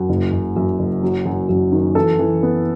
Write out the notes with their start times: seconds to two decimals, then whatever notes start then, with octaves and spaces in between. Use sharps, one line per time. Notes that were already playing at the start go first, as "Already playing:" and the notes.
Already playing: F#2
0.09 F#1
0.32 F#1
0.56 F#2
0.79 F#1
1.03 F#3
1.26 F#2
1.49 F#2
1.72 D#3
1.95 E3 A4
2.19 E3
2.43 B3